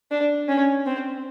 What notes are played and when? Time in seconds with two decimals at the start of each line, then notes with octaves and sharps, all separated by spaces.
0.11 D4
0.49 C#4
0.86 C4